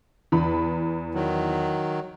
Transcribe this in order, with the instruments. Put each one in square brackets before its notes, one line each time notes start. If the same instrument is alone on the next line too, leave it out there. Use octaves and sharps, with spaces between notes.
[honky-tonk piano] E2 B5
[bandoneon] D#3 F#3